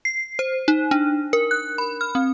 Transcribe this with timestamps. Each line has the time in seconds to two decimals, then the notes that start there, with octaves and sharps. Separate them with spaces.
0.05 C7
0.39 C5
0.68 D#4
0.91 D4
1.33 A#4
1.51 F#6
1.78 B5
2.01 F6
2.15 C4